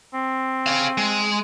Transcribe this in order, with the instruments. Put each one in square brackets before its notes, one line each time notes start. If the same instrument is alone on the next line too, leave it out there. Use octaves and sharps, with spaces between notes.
[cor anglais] C4
[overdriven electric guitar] G#4 F5
G#3